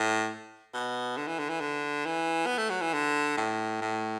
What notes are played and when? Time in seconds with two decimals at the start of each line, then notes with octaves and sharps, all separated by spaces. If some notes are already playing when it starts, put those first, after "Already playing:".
Already playing: A2
0.74 B2
1.17 D3
1.28 E3
1.39 D3
1.49 E3
1.61 D3
2.06 E3
2.46 B3
2.58 A3
2.70 F#3
2.81 E3
2.94 D3
3.37 A2
3.81 A2